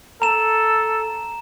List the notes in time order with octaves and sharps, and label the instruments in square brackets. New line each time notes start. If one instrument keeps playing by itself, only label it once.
[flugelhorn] A4 [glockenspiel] A#5 E7